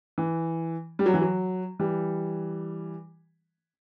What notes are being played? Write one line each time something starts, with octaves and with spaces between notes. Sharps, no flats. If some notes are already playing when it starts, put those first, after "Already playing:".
E3
G3
F#3
E3
F#3
E3 G3